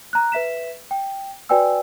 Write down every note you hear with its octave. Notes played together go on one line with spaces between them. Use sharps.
A#5 F#6
B4 E5 B6 E7
G5
F#4 B4 D5 G5 G#5 E6